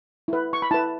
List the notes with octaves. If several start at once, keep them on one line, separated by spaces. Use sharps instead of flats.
E4 B4
C#6
B5
E4 B4 A5